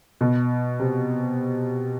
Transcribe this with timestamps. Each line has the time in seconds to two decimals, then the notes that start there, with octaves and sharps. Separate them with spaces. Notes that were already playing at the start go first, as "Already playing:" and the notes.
0.21 B2
0.80 C3